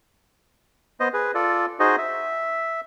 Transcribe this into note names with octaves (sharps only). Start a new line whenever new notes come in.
B3 C5 D#5
G#4 B4
F4 A4 D5
D#4 F#4 G#4 C5 D#5
E5